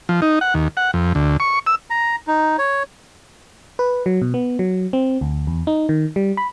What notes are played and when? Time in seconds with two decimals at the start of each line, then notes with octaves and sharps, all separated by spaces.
0.09 F3
0.22 D#4
0.41 F#5
0.54 D#2
0.77 F#5
0.94 F2
1.15 D2
1.40 C#6
1.67 E6
1.90 A#5
2.27 D#4
2.58 C#5
3.79 B4
4.06 F#3
4.22 B2
4.34 B3
4.59 F#3
4.93 C4
5.21 D2
5.47 E2
5.67 D#4
5.89 D#3
6.16 G3
6.37 B5